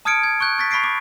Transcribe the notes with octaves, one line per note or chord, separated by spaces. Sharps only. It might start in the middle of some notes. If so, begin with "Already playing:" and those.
A5 D#6 F6 G#6 C#7 D7
G#6
C#6 F#6 G6
C#6 A6 B6
B5 C#6 B6 C7 D7
D6